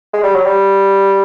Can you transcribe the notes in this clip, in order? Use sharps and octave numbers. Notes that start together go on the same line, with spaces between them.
G#3
G3
F#3
G3